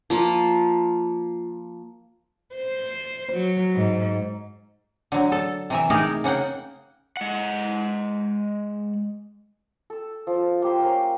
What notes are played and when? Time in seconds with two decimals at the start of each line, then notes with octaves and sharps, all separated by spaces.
0.10 F3 A#3 F4
2.55 C5
3.33 F#3
3.75 G#2
5.12 D3 F#3
5.32 A4
5.70 C3 E3 E5
5.90 A3 D#4 G4 G#4 A#4
6.24 C#3 A#3 F#5 G5
7.17 G#3 F#5
9.90 A4 E6
10.27 F3
10.62 A#3 G4 C5
10.81 C#4 A#4 C5 G5